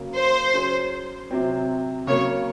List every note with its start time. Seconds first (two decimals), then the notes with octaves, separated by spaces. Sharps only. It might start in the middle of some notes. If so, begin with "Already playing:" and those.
Already playing: C#3 F#3 A#3
0.15 C5
0.54 F#3 C#4 G#4
1.31 C3 F#3 C4
2.07 C#3 F#3 A#3 C#5